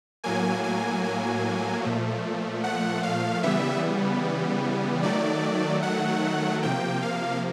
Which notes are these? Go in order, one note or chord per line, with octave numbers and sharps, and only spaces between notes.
A2 F#3 A#3 G#5
G#5
G#5
A#2 F3 A3
F#5
F5
C#3 E3 G3 B3 E5
D#3 F#3 A3 D5
F#5
C3 F3 A#3 G5
F5